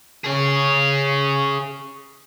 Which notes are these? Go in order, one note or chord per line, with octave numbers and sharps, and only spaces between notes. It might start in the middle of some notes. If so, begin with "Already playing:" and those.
G#4 C#5